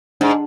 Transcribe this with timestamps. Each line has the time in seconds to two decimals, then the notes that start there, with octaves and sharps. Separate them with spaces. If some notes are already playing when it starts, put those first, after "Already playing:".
0.21 G#2 D4